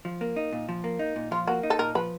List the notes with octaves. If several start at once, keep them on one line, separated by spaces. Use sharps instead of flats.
F3
A#3
D#4
A#2
F3
A#3
D#4
A#2
F3 F4
A#3 F#4
D#4
A4
A#2 A#4
F3 B4